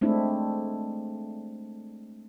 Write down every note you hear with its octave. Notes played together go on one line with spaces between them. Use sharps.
G#3 A3 C4 D4 E4